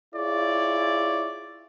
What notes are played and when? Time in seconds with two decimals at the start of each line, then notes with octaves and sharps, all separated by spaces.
0.14 E4 F4 G#4 C#5 D5